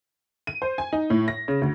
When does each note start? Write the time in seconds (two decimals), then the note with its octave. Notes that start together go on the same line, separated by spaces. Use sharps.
0.47 D#7
0.62 C5
0.78 G#5
0.93 D#4
1.10 A2
1.28 A#6
1.48 C#3
1.62 D2